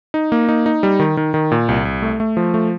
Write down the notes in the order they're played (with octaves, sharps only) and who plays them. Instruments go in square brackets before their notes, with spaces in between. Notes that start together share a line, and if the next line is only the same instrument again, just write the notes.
[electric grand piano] D#4
A#3
D#4
D#4
G3
D#3
D#3
D#3
A#2
C2
C2
A3
A3
F3
A3